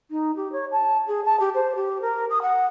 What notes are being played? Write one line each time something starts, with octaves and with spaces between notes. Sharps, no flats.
D#4
G4
C#5
A5
G#4
A5
G4
C5
G4
A#4
D#6
F#5